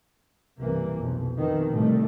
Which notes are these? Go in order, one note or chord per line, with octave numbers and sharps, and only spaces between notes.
B1 G2 C3 E3 A#3
B1 F2
F2 B2 D#3 E3
A2 C3 D#3 G3 A3